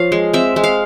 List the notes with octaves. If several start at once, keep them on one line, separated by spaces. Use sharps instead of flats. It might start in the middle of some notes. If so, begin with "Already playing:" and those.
Already playing: F3 C#5 F5
G#3
C4 E5
G#3
F5